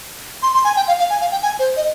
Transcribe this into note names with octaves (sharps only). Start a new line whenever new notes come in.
C6
C6
G#5
G5
F5
F5
G#5
F5
G5
G#5
C5
D#5